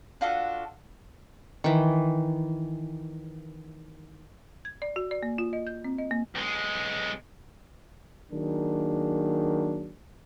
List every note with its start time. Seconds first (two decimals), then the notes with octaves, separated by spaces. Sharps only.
0.21 D4 F4 F#4 A4
1.64 D#3 E3
4.65 G#6
4.82 D5
4.96 F#4
5.11 D5
5.23 A#3
5.38 F4
5.53 D#5
5.67 G6
5.85 C4
5.98 D#5
6.11 A#3
6.35 B1 G#3
8.32 D#3 F#3 A#3 D4 G#4